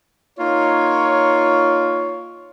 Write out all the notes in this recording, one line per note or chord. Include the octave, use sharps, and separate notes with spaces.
A#3 D#4 F4 C#5